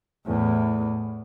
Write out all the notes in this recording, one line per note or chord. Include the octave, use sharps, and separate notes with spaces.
E2 A2